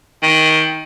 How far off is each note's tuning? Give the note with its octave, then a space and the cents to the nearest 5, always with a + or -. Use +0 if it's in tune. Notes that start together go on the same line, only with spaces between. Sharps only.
D#3 +20